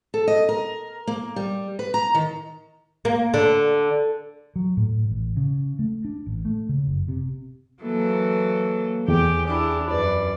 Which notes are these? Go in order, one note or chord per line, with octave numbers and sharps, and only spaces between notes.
A4
D#5
A#4
A#3
G3
B4
A#5
D#3
A#3
D3
F#3
A2
A1
C#3
A3
D4
A1
A3
C#3
F#1
C3
E3 F#3 A#3 A4
E2 G4 G#4 G5
D4 E4 G4
F#2 B4 D5